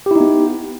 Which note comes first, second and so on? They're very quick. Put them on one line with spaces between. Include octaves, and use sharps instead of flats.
G4 E4 D#4 B3